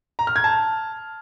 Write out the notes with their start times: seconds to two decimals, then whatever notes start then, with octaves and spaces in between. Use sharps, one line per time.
0.19 A#5
0.27 F6
0.36 G#6
0.44 A5